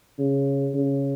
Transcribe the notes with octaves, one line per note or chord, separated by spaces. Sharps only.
C#3
C#3